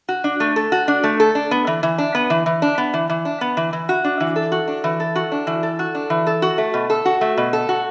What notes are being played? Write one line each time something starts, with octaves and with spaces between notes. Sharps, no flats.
F#4
D4
A3
A4
F#4
D4
A3
A4
D4
B3
E3
E3
D4
B3
E3
E3
D4
B3
E3
E3
D4
B3
E3
E3
F#4
D4
E3
A4
F#4
D4
E3
A4
F#4
D4
E3
A4
F#4
D4
E3
A4
F#4
A3
B2
A4
F#4
A3
B2
A4
F#4